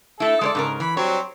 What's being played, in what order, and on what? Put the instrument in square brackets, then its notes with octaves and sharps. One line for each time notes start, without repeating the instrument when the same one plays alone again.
[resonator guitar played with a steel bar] A3 E4 [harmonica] A4
[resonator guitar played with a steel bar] G#3 C5 D5
G#2 C#3 A#4
[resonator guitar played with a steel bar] E3 [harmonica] B5
[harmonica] F#3 G3 C4 [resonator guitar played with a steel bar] C#5